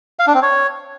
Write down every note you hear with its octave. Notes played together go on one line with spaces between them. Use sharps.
F5
D4
C4
C#5